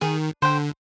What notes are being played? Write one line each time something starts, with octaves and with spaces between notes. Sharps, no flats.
D#3 G#4
D3 C5 G5